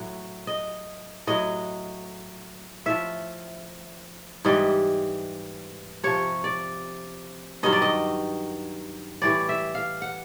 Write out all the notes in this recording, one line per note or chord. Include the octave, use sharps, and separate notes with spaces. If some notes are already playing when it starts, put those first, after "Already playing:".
Already playing: A2 F#3
D#5
A2 F#3 D#5
A2 F3 E5
G#2 E3 G3 D#5
C3 F3 C#5
D5
G2 D#3 F#3 D#5
D5
D#5
A2 E3 G3 D5
E5
F5
F#5